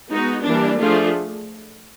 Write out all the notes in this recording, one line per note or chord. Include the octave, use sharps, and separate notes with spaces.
G#3 B3 D#4 F#4
E3 G3 A#3 D4
F3 A3 D4 F4 G#4